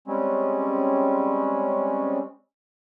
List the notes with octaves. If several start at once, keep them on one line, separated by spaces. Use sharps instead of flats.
G3 G#3 C4 C#4